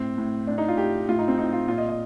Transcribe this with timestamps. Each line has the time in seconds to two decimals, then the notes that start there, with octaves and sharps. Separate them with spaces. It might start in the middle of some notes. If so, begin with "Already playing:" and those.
Already playing: A2 C4
0.18 A2
0.47 A2 D4
0.58 D#4
0.68 F4
0.77 A2 G4
1.09 A2 F4
1.19 D#4
1.28 C4
1.38 A2 D#4
1.53 F4
1.68 A#2 F4
1.78 D#5
1.89 D#5